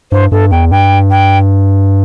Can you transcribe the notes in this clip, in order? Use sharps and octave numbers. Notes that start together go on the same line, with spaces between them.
G2 C5
G2 A4
E2 G5
G2 G5
G5